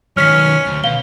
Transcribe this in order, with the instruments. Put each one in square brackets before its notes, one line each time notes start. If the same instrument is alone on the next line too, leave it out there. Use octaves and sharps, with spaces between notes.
[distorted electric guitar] D#3 F#3 [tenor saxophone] C#4 [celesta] F6 B6
[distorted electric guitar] D2
[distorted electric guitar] B2 [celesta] F5 G7